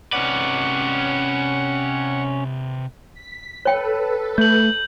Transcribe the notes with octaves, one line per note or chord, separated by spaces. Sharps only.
C3 C#4 B4 D5 F#5
B6
A4 B4 C#5 G5
A3 G6 F#7